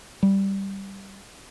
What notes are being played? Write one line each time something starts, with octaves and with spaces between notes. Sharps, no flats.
G3